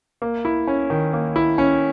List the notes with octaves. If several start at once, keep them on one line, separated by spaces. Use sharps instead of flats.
A#3
E4
C#4
D#3
A#3
E4
C#4